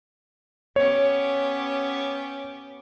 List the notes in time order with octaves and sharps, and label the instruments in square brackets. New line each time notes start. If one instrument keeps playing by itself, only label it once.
[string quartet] B3 C#4 G4 [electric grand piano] C#5